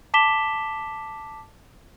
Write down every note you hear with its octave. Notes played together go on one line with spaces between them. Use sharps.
A5 D6 B6 E7 G7